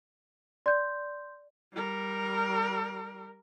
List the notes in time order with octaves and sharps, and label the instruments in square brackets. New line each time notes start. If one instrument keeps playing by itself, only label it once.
[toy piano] D5 [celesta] C6 G6
[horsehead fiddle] G3 A#4